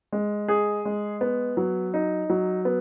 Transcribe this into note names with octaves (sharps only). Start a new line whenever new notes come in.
G#3
G#4
G#3
B3
F#3
D#4
F#3
B3